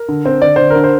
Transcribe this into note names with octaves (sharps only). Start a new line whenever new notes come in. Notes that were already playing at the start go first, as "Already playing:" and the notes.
Already playing: A#4
D3
C4
D3 D5
D3 C5
A#4
D3
C5